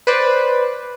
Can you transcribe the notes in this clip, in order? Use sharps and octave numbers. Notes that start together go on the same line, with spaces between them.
B4 C5 D5